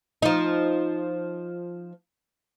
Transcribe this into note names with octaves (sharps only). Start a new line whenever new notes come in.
F3 D#4